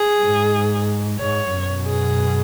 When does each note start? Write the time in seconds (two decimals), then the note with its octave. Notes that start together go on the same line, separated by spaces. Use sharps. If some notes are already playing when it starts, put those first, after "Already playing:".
Already playing: G#4
0.21 G#2
1.19 G#2 C#5
1.52 F#2 B2
1.86 G#4